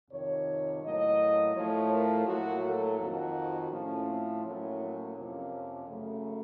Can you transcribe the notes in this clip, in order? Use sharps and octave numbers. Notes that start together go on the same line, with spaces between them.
F2 C3 D#3 C#5
A2 F#3 A#3 D#5
A2 F3 A3 C#5
A#4
A2 F#3 A#3 F#4
A4
F2 D#3 A#3 F#4
A2 F3 A3 C#4
C4
A2 F#3 A#3 C#4
C#4
F2 C3 F3 A#3 C#4
F#2 C#3 A3